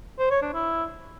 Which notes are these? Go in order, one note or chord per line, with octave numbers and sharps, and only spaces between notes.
C5
C#5
D4
E4